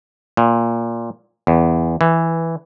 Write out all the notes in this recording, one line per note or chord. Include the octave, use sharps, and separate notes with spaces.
A#2
E2
E3